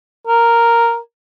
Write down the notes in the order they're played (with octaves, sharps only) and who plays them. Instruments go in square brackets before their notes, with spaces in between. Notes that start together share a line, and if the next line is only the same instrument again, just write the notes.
[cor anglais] A#4